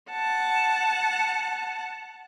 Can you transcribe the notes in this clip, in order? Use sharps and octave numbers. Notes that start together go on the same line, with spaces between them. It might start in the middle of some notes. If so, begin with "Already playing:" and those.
F#5 A5